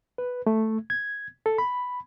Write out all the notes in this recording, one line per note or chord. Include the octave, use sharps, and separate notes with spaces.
B4
A3
G#6
A4
B5